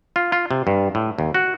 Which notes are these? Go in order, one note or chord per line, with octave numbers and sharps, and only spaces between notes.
F4
F4
C3
G2
A2
D#2
F#4